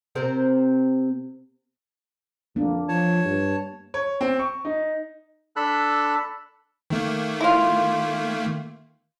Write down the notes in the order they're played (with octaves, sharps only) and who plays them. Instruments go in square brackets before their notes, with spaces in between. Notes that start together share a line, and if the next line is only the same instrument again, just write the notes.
[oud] C3 C4 A#4
[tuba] F2 [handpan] A#3 D4
[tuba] F3 [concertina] C#5 A5
[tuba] G2
[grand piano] C#5
C4
C#6
D#4
[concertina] D4 A4 B5 E6 F#6
[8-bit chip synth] D#3 A3 A#3
[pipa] E4 F4